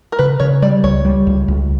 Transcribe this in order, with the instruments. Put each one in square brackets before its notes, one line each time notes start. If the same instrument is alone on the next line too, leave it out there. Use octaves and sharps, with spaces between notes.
[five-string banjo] A#4
[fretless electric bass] C#3 [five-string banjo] B4
[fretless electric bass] C#3 [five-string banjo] C#5
[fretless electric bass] G3 [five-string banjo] D5
[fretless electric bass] C#2 [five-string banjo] C#5
[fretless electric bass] G3
C#2
C#2